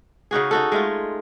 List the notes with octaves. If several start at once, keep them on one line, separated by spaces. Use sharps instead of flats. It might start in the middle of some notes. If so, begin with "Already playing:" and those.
C#3 D#4 F#4 G#4
D#4 F#4 A4
G#3 A3 F4